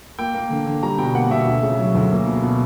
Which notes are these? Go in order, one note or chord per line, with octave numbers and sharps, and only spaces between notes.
A#3 G5
A#3
D3
D3
G3 A#5
B2 G5
A#3 F#5
B2 E5
D2
C#3
F#3
D2
A#3
B2
B2